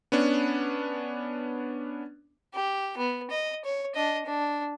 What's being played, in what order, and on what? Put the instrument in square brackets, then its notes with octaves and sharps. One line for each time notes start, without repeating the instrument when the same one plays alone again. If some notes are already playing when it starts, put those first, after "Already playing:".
[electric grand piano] B3 C#4 D4
[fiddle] G4
B3
D#5
C#5
D4 D#5
D4